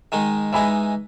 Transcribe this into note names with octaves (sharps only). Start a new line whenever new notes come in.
D#3 G#3 D#4
E3 G#3 D#4 G#5 B5